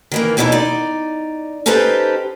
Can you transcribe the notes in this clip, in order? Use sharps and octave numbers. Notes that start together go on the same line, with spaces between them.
D#3 E3 A#3
D#2 B2 E3 D#4 E4 A#5
D#4 D5
C#4 D#4 G4 A4 B4 C5